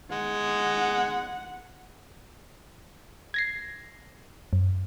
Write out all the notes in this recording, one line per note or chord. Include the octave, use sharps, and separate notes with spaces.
G#3 F#5
G#6 A#6 C7
F#2